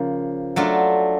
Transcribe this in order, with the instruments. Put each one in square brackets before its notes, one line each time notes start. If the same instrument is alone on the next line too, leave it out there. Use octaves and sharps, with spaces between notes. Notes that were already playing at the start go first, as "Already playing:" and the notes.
Already playing: [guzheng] C#3 F3 A#3
F#3 A3 D4 F4